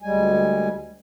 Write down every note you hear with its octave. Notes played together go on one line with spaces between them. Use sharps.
D2 G3 G#3 G#5